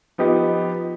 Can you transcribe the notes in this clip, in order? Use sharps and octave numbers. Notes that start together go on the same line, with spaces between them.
F3 B3 D#4 G4